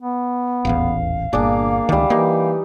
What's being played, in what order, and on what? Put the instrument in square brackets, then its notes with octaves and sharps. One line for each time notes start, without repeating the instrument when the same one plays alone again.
[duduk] B3
[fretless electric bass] D#1 A1 E2 [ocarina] F5
[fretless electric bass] G1 A#2 [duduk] A#3 [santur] D4 G#4 D6
[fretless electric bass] C#2 D#3 [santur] G3 E5
[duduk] E3 [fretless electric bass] A#3 [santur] D#4 G4